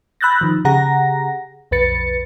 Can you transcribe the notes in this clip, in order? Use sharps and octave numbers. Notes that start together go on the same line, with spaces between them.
B5 E6 F#6 G6 A6 A#6
D#3 F3
C#3 G4 G#4 F#5 A#5 A#6
B1 F2 B4 A6 C#7